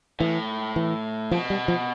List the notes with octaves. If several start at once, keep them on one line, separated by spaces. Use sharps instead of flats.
A2 E3
E3
B2 F3
G3
F3